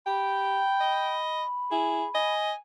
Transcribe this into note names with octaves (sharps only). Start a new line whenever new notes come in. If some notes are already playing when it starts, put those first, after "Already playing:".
G4 G5 B5
D#5
E4 G#4
D#5 G#5